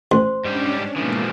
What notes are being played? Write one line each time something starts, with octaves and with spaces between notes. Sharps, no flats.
A1 C5 C6
G#2 G3 C#4 D4 G4
G#2 B2 E3 F3 A3 A#3